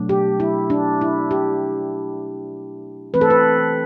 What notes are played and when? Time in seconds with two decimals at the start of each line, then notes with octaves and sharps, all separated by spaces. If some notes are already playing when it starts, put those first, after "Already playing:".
Already playing: B2 F#3 A3 D4
0.09 G4
0.40 E4
0.70 D4
1.01 E4
1.31 G4
3.14 E3 A3 C4 B4
3.21 A4
3.30 B4